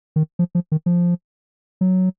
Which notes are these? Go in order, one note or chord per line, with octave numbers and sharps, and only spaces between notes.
D#3
F3
F3
D#3
F3
F#3